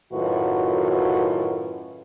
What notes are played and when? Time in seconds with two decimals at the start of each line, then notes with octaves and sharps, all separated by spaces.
0.13 F#2 A2 D#3 F4 F#4 B4